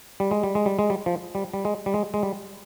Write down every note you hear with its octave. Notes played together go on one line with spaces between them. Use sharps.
G3
G#3
G3
G#3
G3
G#3
G3
F3
G3
G3
G#3
G3
G#3
G#3
G3